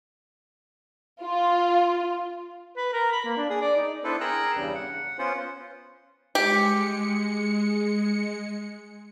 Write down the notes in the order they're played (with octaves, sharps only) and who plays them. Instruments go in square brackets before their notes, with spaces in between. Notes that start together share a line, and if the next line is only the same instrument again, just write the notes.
[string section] F4
[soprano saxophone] B4
A#4
B5
A#3
D4
G#4
D5
D#4
[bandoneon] B3 D4 E4 A4 B4 C5
G#4 A#4 G5 A#5 E6 F#6
E2 G2 C#3 G3
F#5
B3 C#4 F4 C5 F#5
[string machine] G#3 C#7 [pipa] G4